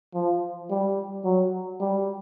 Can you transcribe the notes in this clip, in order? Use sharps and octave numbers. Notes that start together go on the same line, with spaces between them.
F3
G3
F#3
G3